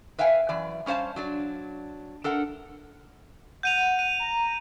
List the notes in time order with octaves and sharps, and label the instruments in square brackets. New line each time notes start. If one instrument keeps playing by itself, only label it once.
[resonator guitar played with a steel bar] B4 E5 F5 G5 G#5
F#2 E3 D5
G3 C#4 C5 F5 A5
F#3 D4 D5
D4 A4 A#4 F#5
[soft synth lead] F#5 [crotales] G6 D#7 F7
[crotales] D#7
[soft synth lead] A#5